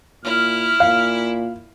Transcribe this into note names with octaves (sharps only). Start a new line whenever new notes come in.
A#2 E4 F6
A#2 F5